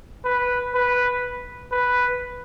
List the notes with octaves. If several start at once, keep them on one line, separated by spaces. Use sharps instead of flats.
B4
B4
B4